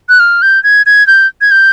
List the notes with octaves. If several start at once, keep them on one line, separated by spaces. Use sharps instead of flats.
F#6
F6
G6
G#6
G#6
G6
G#6
G6